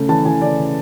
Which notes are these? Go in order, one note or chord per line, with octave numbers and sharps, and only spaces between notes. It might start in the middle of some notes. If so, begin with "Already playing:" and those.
Already playing: C#3 A3
E3 A5
E3 G#5
C#3 D5
C#3